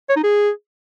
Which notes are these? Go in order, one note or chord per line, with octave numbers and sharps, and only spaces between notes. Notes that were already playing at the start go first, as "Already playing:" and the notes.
C#5
D#4
G#4